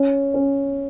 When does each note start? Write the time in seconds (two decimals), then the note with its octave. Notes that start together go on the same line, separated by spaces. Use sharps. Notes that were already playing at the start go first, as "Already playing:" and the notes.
Already playing: C#4
0.34 C#4